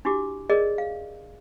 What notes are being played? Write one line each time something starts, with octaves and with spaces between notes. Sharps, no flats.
D4 E4 F#4 G4 D6
G#4 A#4 D5 D#5
F5